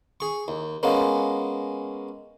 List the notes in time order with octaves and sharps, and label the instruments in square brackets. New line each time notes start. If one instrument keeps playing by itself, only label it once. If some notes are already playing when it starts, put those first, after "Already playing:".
[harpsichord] G#4 C#6
D#2
G#3 A#3 B3 C#4